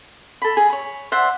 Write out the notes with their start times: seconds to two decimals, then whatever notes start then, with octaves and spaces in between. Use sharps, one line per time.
0.42 A4 B5
0.57 G#4
0.70 C#5 B5
1.12 C5 D5 E5 F#5